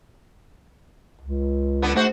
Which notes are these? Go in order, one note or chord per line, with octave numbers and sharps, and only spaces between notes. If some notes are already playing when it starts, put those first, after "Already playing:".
C#2
D3 B3 D4
G#2 A3 F#4 C5